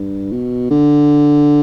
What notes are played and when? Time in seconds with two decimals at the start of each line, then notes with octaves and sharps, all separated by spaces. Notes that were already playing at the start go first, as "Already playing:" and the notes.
Already playing: G2
0.32 B2
0.70 D3